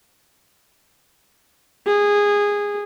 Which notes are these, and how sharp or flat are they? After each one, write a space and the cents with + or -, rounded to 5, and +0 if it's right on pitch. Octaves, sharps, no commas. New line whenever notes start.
G#4 -15